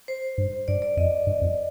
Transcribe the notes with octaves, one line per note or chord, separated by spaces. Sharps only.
C5
G2
G2 D5
D5
F2 D#5
G2
F2